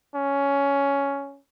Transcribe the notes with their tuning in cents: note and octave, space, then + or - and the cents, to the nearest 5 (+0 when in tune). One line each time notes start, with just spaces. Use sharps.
C#4 +10